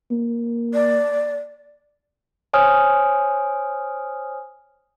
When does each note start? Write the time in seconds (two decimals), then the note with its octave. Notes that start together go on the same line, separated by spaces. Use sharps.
0.11 A#3
0.74 D5
2.53 C5 C#5 G#5 D#6 F6